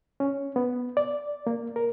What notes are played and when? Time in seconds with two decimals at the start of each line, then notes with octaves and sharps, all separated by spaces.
0.20 C#4
0.56 B3
0.97 D5
1.47 A#3
1.76 A#4